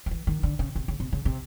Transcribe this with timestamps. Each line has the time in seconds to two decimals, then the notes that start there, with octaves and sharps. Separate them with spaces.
0.06 D#3
0.11 E3
0.27 D#3
0.43 D3
0.59 C#3
0.76 C3
0.88 C#3
1.00 C3
1.12 C#3
1.25 C3